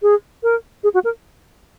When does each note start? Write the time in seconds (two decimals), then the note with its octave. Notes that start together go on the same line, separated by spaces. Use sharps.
0.02 G#4
0.43 A#4
0.84 G#4
0.94 F#4
1.04 A#4